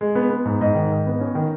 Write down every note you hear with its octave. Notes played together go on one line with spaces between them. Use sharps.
G#3
B3
B3
G#2
G#2 D#5
D#3
G#2
B3
C#4
D#3